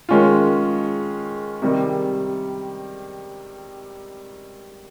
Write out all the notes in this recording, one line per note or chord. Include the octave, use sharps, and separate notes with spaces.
D#3 G#3 C#4 F4
C3 D#3 G3